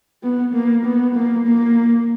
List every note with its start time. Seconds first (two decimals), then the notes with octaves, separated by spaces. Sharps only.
0.23 B3
0.54 A#3
0.85 B3
1.15 A#3
1.47 A#3